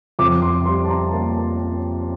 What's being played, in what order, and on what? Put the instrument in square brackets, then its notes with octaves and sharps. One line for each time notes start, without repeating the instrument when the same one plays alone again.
[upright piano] F2 D6
C6
G3 C6
A5
A#5
A#3 A5